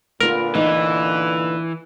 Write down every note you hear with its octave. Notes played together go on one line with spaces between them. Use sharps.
A#2 D3 B3 F4 A#4 B4
E3 B3 D#4